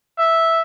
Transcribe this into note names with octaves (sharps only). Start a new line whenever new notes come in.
E5